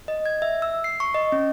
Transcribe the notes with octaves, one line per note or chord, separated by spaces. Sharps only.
D#5
G#6
E5
E6
C7
C#6
D#5
C#4